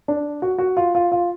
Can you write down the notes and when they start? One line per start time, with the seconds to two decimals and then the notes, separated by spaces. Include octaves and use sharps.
0.08 D4
0.42 F#4
0.58 F#4
0.77 F4
0.95 F4
1.12 F4